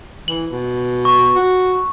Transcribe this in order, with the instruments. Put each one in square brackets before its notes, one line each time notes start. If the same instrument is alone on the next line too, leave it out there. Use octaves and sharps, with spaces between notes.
[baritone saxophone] E3 [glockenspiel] F#7
[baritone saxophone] B2
[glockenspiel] C#6
[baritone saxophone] F#4